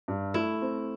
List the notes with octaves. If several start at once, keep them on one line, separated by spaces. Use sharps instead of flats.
G2
A3 E4
C4